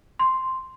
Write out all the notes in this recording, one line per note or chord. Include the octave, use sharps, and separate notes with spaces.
C6